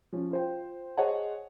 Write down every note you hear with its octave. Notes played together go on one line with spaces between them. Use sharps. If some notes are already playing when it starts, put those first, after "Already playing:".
F3 C#4
F4 C5 G5
G#4 C5 C#5 D#5 F#5 A5